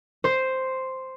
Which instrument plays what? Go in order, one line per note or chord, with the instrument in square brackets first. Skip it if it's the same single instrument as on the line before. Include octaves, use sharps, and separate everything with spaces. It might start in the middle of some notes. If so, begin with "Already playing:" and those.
[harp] C5